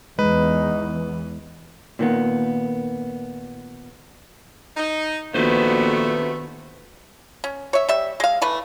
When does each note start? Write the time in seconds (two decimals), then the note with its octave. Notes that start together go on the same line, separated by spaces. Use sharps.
0.19 E2 G#3 D#4 B4
1.99 A#2 D#3 A#3 B3
4.77 D#4
5.34 A#1 C3 D#3 A3 B3 F#4 B4 C5
7.44 C#4
7.73 C#5 E5
7.89 G3 E5
8.20 G#3 F5
8.42 E3 A3 B4